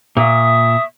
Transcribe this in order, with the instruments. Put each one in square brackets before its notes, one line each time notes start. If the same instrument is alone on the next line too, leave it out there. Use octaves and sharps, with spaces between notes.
[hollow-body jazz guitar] A#2 [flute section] E5 C#6 D#6